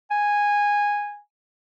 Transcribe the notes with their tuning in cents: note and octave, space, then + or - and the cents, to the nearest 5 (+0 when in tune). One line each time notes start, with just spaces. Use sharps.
G#5 -10